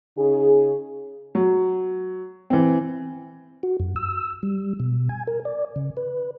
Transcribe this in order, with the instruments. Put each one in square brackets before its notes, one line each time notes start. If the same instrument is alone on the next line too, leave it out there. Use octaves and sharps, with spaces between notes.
[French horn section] C#3 D#4 G#4
[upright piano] F#3
E3 C4
[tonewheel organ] F#4
F#2
E6
G3
B2
G#5
A#4
D5
C#3
B4